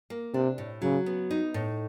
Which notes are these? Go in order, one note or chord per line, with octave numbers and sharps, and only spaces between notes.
A#3
C3 D4
A2
C#3 F#3
B3
D#4
A2